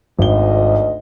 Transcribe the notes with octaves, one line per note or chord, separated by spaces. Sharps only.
G#1 D2 D#5 G7